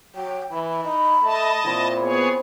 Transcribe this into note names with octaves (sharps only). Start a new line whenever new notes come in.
F#3 G5
E3 B5
D#4
A3 D#5 A5
A#2 C4 E4
B3 G#4 C#5